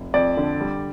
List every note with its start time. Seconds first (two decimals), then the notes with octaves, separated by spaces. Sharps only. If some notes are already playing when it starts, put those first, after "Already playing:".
Already playing: F1
0.14 F2 D5
0.37 D3
0.61 G3